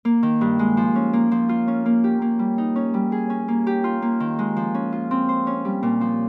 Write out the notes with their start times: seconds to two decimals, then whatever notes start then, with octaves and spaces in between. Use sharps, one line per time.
0.05 A#3
0.23 D#3
0.41 G2
0.59 G#3
0.77 F3
0.95 C#4
1.13 A#3
1.31 F3
1.49 F4
1.68 C#4
1.86 A#3
2.04 G4
2.22 A#3
2.39 G3
2.58 D#4
2.76 C#4
2.94 G3
3.12 G#4
3.30 C#4
3.48 A#3
3.67 G4
3.84 F4
4.02 A#3
4.20 D#3
4.39 G#3
4.56 F3
4.74 C#4
4.92 F4
5.11 C4
5.29 C5
5.47 C#4
5.65 G3
5.83 A#2
6.01 F3